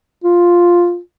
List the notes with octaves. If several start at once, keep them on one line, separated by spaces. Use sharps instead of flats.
F4